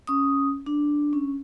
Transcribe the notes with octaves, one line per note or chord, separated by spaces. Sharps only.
C#4 D#6
D4
C#4